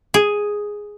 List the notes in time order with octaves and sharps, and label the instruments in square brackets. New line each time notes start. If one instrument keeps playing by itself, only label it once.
[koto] G#4